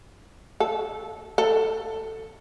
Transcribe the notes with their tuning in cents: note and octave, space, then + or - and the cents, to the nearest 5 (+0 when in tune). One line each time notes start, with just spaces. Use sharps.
A4 -15
A4 +10